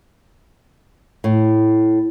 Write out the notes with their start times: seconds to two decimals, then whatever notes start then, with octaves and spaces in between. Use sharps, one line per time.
1.24 A2